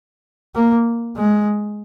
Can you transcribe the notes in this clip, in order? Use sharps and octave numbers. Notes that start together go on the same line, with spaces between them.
A#3
G#3